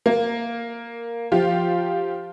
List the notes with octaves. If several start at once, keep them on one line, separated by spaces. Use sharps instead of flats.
A#3
F3 F4 G4